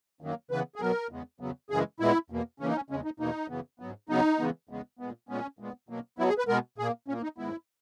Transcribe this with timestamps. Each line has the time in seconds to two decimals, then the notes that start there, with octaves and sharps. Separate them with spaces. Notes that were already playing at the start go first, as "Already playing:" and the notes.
0.21 F#2 D#3 F#3 A#3
0.51 C#3 E3 B3 B4
0.76 G#4
0.81 B2 F#3 B3 A#4
1.11 E2 C#3 G#3 B3
1.40 E2 C#3 F#3 B3
1.70 F#2 C#3 E3 G#3 G#4
2.00 A#2 G#3 B3 E4
2.30 E2 B2 A#3
2.60 C#3 E3 A#3 C#4
2.68 D#4
2.76 C#4
2.90 E2 C#3 G#3 C#4
3.05 D#4
3.20 E2 B2 A#3 D#4
3.50 F#2 C#3 E3 B3
3.80 G#2 F#3 B3
4.09 C#3 F#3 B3 D#4
4.39 C#3 E3 G#3 B3
4.69 E2 C#3 G#3 B3
4.99 A#2 G#3 B3
5.29 A#2 G#3 B3 C#4
5.59 A#2 G#3 B3
5.89 B2 F#3 A#3
6.18 B2 F#3 B3 E4
6.29 G#4
6.38 B4
6.48 B2 G#3 B3 A#4
6.78 A#2 A#3 G#4
7.08 A#2 C#4
7.12 A#3
7.23 D#4
7.38 G#2 D#3 G#3 B3 E4